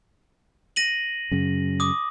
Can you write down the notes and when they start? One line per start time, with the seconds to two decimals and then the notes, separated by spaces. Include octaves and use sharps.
0.76 A#6 D#7 F#7
1.31 F#2 C#3
1.80 D6 D#6